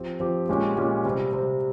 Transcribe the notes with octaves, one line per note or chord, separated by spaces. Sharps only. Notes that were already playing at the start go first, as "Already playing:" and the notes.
Already playing: F3 C4 G4
F3 C4 G4
A#2 G#3 C#4 G4
A#2 G#3 C#4 G4
C3 G3 C4
C3 G3 C4